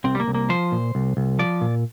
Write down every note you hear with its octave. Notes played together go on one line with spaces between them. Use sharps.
C2 C4
G3
A#3
C2
A#3
F3 C5
A#2
C2
C2
F3 D5
A#2